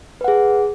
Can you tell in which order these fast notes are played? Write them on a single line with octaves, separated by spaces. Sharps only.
B4 F#5 G#4